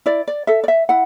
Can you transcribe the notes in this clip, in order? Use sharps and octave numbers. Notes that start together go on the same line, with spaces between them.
E4 D5
D5
A4 E5
D5
E5
E4 F#5